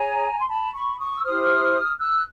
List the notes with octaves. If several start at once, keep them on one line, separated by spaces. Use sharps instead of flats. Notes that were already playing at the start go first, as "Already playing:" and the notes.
Already playing: G#4 C#5 G#5 A#5
C6
A5 B5
B5 C#6
C#6 D#6
D#6
E6
E4 G4 C5 D#6 F6
E6 F#6